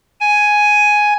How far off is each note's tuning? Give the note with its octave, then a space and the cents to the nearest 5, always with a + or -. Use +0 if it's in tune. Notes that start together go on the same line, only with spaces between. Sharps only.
G#5 +5